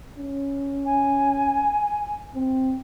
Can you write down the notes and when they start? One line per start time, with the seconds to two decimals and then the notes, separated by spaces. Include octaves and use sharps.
0.18 C#4
0.85 G#5
2.35 C4